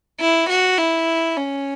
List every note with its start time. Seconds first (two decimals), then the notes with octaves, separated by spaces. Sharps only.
0.20 E4
0.50 F#4
0.78 E4
1.37 C#4